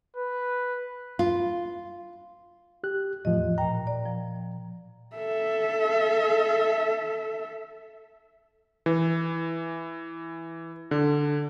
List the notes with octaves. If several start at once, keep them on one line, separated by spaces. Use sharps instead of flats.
B4
F4
G4 F#6
E2 A2 F3 D#5
A#2 G5 A#5
D5
F3
A4 E5
E3
D3